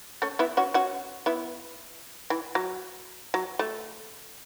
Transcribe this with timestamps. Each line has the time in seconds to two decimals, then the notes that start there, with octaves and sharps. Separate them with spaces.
0.22 A3 C#4
0.39 B3 E4
0.57 C#4 F#4
0.74 C#4 F#4
1.26 B3 E4
2.30 E3
2.55 F#3
3.34 F#3
3.59 A3